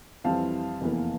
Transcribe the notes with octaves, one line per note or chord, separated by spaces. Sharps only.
F2 E3 G3 C4 E4 F5 A5
F1 E2 E3 A#3